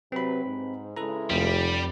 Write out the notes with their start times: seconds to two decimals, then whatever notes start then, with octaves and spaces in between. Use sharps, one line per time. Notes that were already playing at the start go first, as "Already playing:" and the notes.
0.12 C3 F#3 C4 B4 B5
0.44 G#2
0.97 C#3 G#3 E4 A4 B4 A#5
1.30 F1 F2 F3 G3